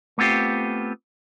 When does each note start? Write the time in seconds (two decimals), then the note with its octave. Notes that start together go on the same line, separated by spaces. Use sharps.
0.18 A3 B3 C4 F4 G4